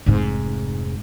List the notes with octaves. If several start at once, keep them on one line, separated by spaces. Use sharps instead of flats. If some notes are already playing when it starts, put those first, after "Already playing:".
F1 G#2